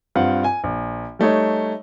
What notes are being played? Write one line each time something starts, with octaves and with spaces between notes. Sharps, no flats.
G2 C4 F4 F#5
G#5
A#1
G3 A3 D#4 C#5